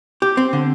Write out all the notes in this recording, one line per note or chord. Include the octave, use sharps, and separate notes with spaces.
G4
C4
D3